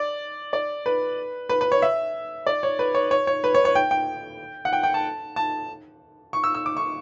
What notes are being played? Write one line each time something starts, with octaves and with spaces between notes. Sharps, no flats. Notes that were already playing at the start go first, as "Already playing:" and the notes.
Already playing: D5
D5
B4
B4
B4
C#5
E5
D5
C#5
B4
C#5
C#5
C#5
B4
C#5
C#5
G5
G5
F#5
G5
G5
A5
A5
C#6
E6
E6
D6
C#6